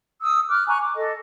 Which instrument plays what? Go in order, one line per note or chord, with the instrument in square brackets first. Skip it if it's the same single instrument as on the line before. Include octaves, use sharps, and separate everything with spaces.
[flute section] D#6 E6
D6 F6 F#6
G#5 A#5 C#6 F#6
D6
A4 D#5